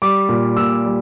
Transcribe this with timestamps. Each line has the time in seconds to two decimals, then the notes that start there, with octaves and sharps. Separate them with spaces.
0.02 G3 D6
0.29 A#2
0.57 A#2 E6
0.85 G3